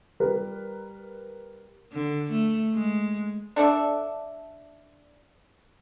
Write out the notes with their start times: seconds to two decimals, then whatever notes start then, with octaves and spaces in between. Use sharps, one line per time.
0.20 G3 A#4 B4
1.93 D3
2.31 A3
2.74 G#3
3.56 D4 A4 D5 E5